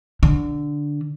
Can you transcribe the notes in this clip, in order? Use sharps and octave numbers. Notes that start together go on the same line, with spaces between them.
D3